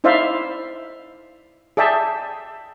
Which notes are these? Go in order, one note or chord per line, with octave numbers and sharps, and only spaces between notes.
D#4 E4 C5 D5 E5 F5
G#4 D5 E5 G5 A5